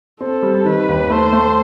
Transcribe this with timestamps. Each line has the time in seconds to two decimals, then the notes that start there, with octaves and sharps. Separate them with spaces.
0.21 C4 A4
0.43 G3
0.65 D#3 B4
0.89 D#2
1.10 A3 C5
1.33 A3